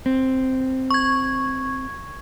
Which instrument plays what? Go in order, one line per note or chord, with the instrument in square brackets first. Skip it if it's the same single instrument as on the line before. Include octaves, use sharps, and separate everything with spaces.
[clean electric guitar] C4
[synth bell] C#6 G#6